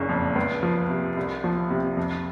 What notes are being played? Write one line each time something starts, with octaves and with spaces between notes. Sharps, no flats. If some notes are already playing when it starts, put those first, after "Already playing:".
Already playing: F#1 A#2 C#3
F2
C#2
F3
C3
C2
F3
C3
F2